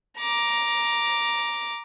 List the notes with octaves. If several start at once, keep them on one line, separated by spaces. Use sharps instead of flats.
A#5 D6